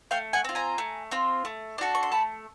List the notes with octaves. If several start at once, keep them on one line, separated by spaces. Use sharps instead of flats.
A3 F5 G5
F#5 G#5
C4 F4
G#5 A#5
A3
C4 F4
A3
D4 F#4 A4
C#6
C6
A3 A5 B5